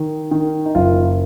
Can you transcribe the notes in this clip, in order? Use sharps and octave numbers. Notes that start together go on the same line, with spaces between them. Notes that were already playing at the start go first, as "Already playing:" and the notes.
Already playing: D#3
D#3
D#4
F#1 F4